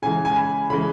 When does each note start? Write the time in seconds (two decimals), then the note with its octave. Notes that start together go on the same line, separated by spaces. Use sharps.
0.02 C#3 E3 G#3 G#5
0.25 G#5
0.36 B5
0.70 C#3 E3 G#3 B5